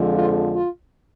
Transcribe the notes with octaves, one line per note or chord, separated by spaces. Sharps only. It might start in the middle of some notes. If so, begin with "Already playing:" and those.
Already playing: F2 D3 F3 G#3
F4
F4